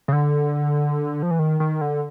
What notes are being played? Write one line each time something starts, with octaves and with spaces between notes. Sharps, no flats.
C#3
D3
F3
E3
D#3
D#3
D3